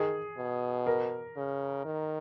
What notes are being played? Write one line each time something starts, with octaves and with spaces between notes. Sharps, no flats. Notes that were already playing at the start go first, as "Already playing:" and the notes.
Already playing: D#3 G#4
B2
A#4
C#3
D#3